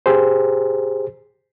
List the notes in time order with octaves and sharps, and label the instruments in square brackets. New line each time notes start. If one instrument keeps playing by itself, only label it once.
[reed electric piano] G4 G#4 C5